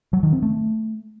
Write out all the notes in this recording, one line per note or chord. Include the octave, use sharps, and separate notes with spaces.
F#3
D#3
C4
A3